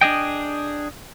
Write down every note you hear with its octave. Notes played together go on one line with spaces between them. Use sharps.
D4 G#4 D#5 G5